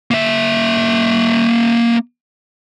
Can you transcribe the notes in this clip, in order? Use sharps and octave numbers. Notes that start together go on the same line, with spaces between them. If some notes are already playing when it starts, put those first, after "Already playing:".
A#3 E5